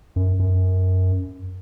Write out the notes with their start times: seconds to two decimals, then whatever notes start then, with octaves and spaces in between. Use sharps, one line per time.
0.16 F#2
0.39 F#2